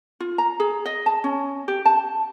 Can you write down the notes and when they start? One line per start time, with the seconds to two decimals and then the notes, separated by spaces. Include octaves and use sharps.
0.20 F4
0.38 A#5
0.60 G#4
0.86 D#5
1.06 A5
1.24 C#4
1.68 G4
1.85 A5